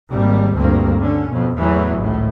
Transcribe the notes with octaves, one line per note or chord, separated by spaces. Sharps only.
G#1 G3 A#3
D2 G2 A#3 C4
D3 C#4
F2 B2
E2 A2 E3 F#3
G#1 C#2 A2